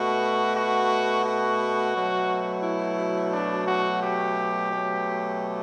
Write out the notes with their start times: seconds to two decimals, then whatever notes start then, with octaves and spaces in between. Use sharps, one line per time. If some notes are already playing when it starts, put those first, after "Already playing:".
Already playing: B2 A3 F#4
0.56 F#4
1.24 F#4
1.94 B2 F#3 A3
2.63 E4
3.33 D4
3.67 F#4
4.02 G4
4.71 B2 F#3 A3